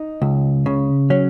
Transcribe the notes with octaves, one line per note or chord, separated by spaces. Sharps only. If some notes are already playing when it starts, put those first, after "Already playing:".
Already playing: D#4
C#2
C#3
F#3 C#4